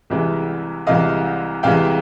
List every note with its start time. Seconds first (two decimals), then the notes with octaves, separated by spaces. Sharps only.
0.10 C2 C3 E3 G#3
0.87 C2 C3 E3 G#3 D#5 F5
1.63 C2 C3 E3 G#3 F5 G5